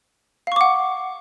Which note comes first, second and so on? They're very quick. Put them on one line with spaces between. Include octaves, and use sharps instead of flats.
F5 C#6 D6 F#5